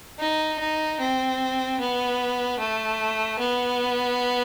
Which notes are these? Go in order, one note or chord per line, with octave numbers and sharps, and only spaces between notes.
D#4
D#4
C4
B3
A3
B3